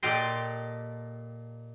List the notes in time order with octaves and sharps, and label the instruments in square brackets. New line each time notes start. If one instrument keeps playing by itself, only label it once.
[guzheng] A#2 G4 A4 D#5 G5 C6